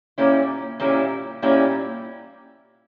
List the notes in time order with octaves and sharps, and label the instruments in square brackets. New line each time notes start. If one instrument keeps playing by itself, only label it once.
[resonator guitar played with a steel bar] A#2 G3 A#3 C#4 E4
A#2 G3 A#3 C#4 E4
A#2 G3 A#3 C#4 E4